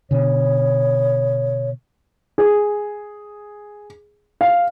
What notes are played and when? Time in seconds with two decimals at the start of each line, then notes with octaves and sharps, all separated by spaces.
0.11 B2 D3 C#5
2.38 G#4
4.41 F5